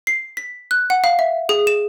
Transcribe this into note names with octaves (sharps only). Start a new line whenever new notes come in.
C7
B6
F#6
F#5
F5
E5
G#4
E7